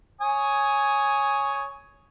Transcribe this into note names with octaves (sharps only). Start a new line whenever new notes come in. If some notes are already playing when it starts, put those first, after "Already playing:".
C#5 G#5 D#6